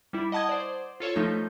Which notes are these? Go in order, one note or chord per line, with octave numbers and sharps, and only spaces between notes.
G3 E4
D#5 F#5 A5 D#6 G#6
C5 D5
F4 A4 C#5
F3 A3 D#4 G6